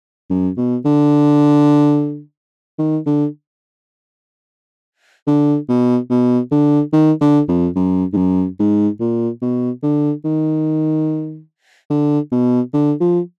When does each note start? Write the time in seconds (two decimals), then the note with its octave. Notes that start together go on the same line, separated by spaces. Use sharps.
0.30 F#2
0.57 B2
0.85 D3
2.79 D#3
3.06 D3
5.27 D3
5.69 B2
6.10 B2
6.52 D3
6.93 D#3
7.21 D3
7.48 F2
7.76 F#2
8.13 G#2
8.17 F#2
8.59 G#2
9.00 A#2
9.42 B2
9.83 D3
10.25 D#3
11.90 D3
12.32 B2
12.73 D3
13.00 F3